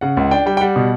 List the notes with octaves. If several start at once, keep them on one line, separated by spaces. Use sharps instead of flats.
C#3 F#5
C#2
D4 G5
G3 G5
G5
G3 F#5
B2